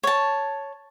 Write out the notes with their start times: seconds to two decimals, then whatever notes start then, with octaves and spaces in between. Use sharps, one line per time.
0.03 C#5 A5